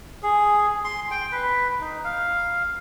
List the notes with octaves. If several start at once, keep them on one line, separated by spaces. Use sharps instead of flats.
G#4
C6
G5
B4
D#4
F5